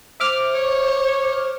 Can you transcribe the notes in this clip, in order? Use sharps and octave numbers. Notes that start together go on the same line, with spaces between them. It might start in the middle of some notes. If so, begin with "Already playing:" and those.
C5 E5 D6 F6
C#5